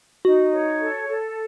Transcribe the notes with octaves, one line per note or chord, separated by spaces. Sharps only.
D#4 F#4
C#5
A4
A4